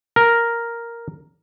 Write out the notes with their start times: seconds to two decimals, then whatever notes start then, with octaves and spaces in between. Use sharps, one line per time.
0.16 A#4